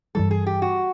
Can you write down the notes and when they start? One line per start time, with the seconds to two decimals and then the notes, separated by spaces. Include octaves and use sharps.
0.15 G2 E3 G3 A4
0.31 G#4
0.46 G4
0.62 F#4